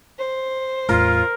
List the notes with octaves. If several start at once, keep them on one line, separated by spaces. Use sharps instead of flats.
C5
E2 A2 A3 F4 A#4